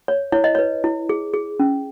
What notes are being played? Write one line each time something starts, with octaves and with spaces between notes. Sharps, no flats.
C#5
E4 C#5
D#5
B4 C#5
E4
G#4
G#4
C#4